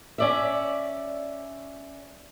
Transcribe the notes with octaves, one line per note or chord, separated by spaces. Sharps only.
C#4 D5 E5